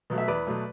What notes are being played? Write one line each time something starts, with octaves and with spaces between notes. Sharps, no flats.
B2 F#3 A3
E5
E2 B4 D5
B2 F#3 A3